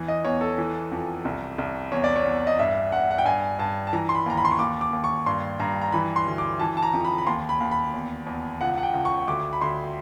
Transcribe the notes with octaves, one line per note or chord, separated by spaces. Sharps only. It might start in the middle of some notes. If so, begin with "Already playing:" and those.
Already playing: E2 E3
D#5
E2 C#5
A4
E3
F2
C2
C2
E2 C#5
D5
C#5
E2
D#5
G2 E5
G2 F#5
F#5
G5
G2 G#5
G2 A5
A5
E3 A#5
C6
B5
D#2 A#5
B5
C6
C#6
D#2 D6
D6
D#2
C#6
G2 C6
G2 A#5
A#5
E3 B5
C6
D2
D6
E3 A5
A5
A#5
F2
B5
B5
D#2 C6
B5
D#2
B5
E2
E2
C#2 F#5
F#5
G5
C#2
C#6
D2 D6
B5
D2 C6